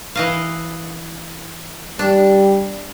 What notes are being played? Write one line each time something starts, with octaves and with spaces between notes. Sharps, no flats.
E3 D#5 F5
G3 D4